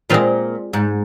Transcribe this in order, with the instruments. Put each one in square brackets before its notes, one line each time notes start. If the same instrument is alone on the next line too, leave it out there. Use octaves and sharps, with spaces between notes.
[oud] A#2 [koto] G#3 C4 F4
[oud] G#2